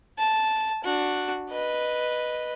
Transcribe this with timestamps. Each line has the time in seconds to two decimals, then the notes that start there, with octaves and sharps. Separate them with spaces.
0.18 A5
0.84 D4 F#4
1.50 B4 D#5